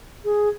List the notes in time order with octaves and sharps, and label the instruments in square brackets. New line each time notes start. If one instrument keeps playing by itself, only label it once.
[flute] G#4